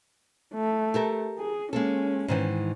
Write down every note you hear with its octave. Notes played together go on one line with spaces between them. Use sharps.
A3
G4 A4 A#4
G#4
G#3 A#3 C#4 A4
G#2 D#3 E3